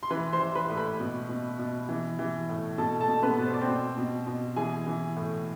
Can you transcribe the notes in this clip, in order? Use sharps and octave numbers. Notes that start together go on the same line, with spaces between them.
C6
E3 B4 B5
C5 C6
E3
B4 B5
A2
B4 B5
B2
B2
B2
E3
E3
A2
B2 A4 A5
A4 A5
B2
B3 B4
B2
C5
D5
C4 C5
B2
B2
B2
E3 G#4 G#5
E3
A2